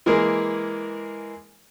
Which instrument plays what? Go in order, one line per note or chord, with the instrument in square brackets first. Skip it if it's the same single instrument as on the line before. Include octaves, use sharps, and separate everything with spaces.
[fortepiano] E3 G#3 A#3 G#4 A#4